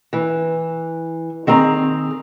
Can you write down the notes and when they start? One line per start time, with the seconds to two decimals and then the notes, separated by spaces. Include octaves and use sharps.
0.13 E3
1.47 D#3 C4 G#4 A#5